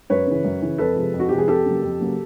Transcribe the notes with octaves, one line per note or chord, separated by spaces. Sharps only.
F#2 B4 C#5
C#3 E3
F#2
C#3 E3
F2 A4 B4
C3 F3 G#3
F2
F#4
C3 F3 G#3 G4
G#4
F2 G4 A4
C#3 F#3 A#3
F2
C#3 F#3 A#3